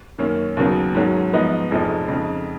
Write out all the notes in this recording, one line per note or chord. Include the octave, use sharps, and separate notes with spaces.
F#2 D#3 A#3 C#4
D#2 C#3 F#3 B3
G#2 D#3 F#3 C#4
G#2 F3 B3 D#4
F1 F2 F3 G#3 D#4
F2 C#3 G#3 D#4